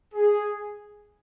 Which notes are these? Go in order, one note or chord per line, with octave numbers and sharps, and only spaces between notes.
G#4